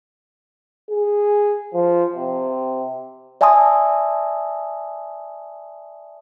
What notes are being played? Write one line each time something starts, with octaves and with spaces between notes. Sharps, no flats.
G#4
F3
C3
D5 E5 G#5 A5 C6 D#6